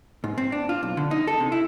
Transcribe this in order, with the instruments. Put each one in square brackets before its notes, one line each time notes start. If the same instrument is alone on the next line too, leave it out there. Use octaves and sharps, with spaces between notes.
[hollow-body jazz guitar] G#2
C4
D4
F4
B1
D3
D#4
A4
C3
E4